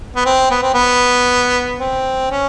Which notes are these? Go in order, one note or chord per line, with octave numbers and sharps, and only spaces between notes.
B3
C4
B3
C4
B3
C4
C#4